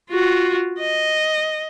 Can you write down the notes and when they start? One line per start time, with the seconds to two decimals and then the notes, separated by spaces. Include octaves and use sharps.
0.10 F4 F#4
0.80 D#5